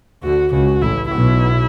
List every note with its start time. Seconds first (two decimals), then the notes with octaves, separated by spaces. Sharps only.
0.22 D2 D3 F#4
0.52 C#2 C#3 F#4
0.82 A1 A2 E4
1.11 B1 B2 E4